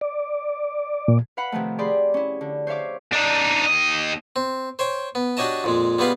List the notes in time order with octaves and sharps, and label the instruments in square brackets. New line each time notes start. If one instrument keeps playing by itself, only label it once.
[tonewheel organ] D5
[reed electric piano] A#2
[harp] B4 F5 F#5 B5
C3 D#3 F3 A3
G4 G#4 D5 B5 C6
C#4 E4
D3
C5 C#5 E5 F5 D6
[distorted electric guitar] D4 D#4
D#2 D#5
[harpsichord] C4
C5 C#5 G5
B3
D4 F#4 G4 C#5 D#5 A5
F2 A#2 G#3
G3 G#3 B3 B4 F5